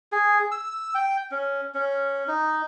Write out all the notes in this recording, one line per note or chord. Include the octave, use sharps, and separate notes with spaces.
G#4
E6
G5
C#4
C#4
D#4